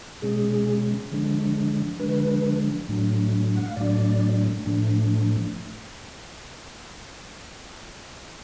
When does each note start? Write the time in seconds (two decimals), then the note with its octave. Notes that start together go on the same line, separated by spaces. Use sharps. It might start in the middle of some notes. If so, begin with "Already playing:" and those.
0.22 B2 G#3 C#4 G#4
1.11 D3 F3 G#3 D4
1.99 D3 F3 G#3 D4 B4
2.89 A2 F#3 A3 D4
3.55 F#5
3.66 F5
3.76 A2 F#3 A3 D4 D5
4.66 A2 F3 A3 D4